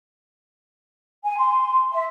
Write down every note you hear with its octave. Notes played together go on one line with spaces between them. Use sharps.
G#5
C6
E5